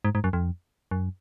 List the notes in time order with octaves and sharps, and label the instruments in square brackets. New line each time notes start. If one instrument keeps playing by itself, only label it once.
[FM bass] G#2
G#2
F#2
F2
F#2